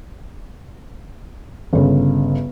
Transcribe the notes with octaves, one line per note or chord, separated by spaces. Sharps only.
G1 C#3